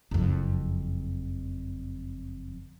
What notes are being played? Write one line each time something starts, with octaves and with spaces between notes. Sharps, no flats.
F#1 F2